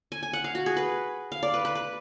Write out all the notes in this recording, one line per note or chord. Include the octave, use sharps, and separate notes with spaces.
G#5
G#5
F#5
F5
F#4
G#4
B4
F5
D5
B4
B4
B4